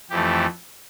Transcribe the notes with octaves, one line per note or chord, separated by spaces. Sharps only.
F2 E3 A3 G4